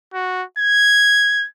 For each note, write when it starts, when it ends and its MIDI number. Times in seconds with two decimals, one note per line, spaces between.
0.14 0.44 66
0.59 1.47 92